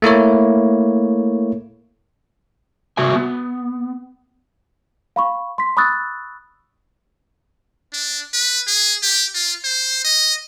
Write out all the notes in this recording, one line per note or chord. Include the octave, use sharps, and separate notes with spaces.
A3 A#3 E4 C#5
C3 F#4 A#4 E5 G#5
B3
F5 B5 C#6
C6 B6
B5 C#6 D#6 E6 F#6 A6
D4
B4
G#4
G4
F4
C5
D#5